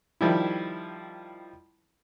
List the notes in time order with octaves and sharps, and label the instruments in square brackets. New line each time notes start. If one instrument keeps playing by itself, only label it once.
[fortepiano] D#3 F3 G3 E4